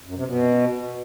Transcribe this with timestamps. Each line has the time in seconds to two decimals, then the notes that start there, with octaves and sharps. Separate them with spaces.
0.05 F#2
0.15 C3
0.26 B2